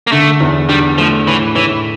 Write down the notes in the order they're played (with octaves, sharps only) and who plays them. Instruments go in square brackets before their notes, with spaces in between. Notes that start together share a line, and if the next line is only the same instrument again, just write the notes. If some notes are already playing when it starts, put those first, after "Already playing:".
[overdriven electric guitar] A#3
[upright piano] D3 [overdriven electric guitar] A3
[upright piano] E2
[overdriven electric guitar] G3 [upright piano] D4
[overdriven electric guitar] F3 [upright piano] A3
[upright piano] A2 [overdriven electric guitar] E3
[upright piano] A2 [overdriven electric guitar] E3